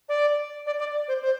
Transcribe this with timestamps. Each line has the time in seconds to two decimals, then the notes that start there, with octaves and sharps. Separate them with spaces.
0.09 D5
0.66 D5
0.79 D5
1.08 C5
1.22 C5